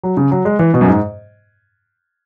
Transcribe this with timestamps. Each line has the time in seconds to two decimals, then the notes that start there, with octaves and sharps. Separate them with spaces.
0.04 F#3
0.17 C#3
0.31 F#3
0.45 G#3
0.59 E3
0.74 B2
0.81 F#2
0.88 G#2